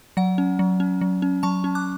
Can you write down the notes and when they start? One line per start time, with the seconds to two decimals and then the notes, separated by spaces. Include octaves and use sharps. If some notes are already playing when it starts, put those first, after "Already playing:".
0.17 F#3 F#5
0.38 C#4
0.59 F#3
0.80 C#4
1.01 F#3
1.22 C#4
1.43 F#3 A5 C#6
1.64 C#4
1.75 D6 F#6